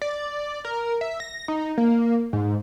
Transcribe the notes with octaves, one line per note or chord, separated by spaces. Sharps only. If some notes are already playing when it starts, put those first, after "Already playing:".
D5
A#4
E5
A#6
D#4
A#3
G#2